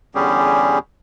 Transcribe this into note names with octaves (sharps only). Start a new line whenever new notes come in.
E2 D3 G3 C#4 G4 G#4